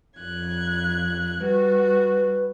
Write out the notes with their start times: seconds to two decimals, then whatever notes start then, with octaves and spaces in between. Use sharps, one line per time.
0.19 F2 F#6 G#6
1.40 G3 F#4 B4